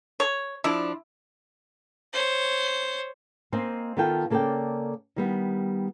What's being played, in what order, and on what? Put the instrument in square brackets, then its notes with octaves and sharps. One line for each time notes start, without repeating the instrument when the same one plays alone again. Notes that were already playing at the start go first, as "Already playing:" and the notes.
[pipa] C#5
[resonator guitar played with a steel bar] F3 D4 [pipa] E4
[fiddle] C5 C#5
[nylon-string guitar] A#3 C4 C5 D#5 G#5
D#3 B3 F4 A4 G5 A5
C#3 A#3 A4 C#5 D5 G5
D#3 G3 B3